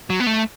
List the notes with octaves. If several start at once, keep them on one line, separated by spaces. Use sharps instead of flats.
F#3
B3
A3